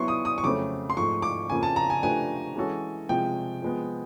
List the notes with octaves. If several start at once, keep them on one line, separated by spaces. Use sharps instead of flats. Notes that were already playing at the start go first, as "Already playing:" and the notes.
Already playing: F#3 B3 E4 C6 C#6
D#6
D#6
C#6
F2 C#3 F#3 A3 C4 D6
C6
G#2 F3 A3 C#6
D6
F2 C#3 F3 A#3 G#5
A5
A#5
G#5
F3 A3 D4 G4 B4 G#5
E3 G#3 C#4 F#4 A4
C3 F3 G#3 G5
F3 G#3 B3